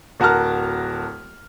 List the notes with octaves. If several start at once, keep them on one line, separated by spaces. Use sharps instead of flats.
D1 F#4 A#4 A5 F6